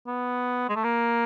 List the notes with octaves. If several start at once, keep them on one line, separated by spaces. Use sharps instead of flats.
B3
G#3
A3
A#3